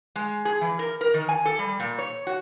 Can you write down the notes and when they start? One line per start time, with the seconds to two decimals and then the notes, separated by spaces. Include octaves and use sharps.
0.16 G#3
0.45 G#4
0.61 E3
0.79 A#4
1.01 A#4
1.14 D#3
1.29 G#5
1.45 A4
1.59 G3
1.80 A#2
1.99 C#5
2.27 F#4